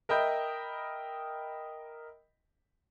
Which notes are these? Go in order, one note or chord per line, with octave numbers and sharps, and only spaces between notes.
A#4 D#5 E5 G5 B5 G6